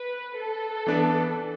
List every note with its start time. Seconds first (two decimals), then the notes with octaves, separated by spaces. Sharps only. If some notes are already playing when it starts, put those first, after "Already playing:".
Already playing: B4
0.38 A4
0.87 E3 B3 D4 B4 D5